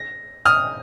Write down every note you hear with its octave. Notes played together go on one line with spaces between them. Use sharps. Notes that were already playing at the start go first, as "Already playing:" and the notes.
Already playing: A#6
D#6 F6